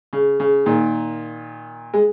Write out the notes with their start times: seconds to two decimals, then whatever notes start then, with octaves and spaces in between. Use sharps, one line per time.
0.13 C#3
0.40 C#3
0.66 A#2 D#3
1.94 G#3